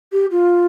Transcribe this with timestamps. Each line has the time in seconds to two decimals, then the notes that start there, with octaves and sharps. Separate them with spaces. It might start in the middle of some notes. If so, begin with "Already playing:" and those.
0.13 G4
0.31 F4